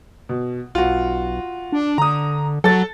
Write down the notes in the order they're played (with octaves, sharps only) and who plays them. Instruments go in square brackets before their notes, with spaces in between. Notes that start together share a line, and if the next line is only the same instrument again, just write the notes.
[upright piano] B2
[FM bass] B1 [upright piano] F4 F#4
[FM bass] D4
[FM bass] D3 [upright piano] A#5 D#6
[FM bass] F#3 [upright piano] A4 A6